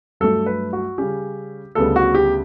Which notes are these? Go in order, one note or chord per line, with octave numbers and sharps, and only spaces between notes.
G2 F#3 A3 A4
B4
F#4
C#3 G3 C#4 G4
D2 C#3 G3 B3 A4
F#4
G4